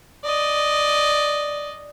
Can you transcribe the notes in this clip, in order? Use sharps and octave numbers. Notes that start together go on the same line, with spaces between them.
D5 D#5